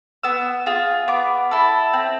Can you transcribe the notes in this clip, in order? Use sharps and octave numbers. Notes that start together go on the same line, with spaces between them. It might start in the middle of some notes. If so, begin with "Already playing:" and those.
B3 E6
F4 G#4
B3 D6
E4 A4
C4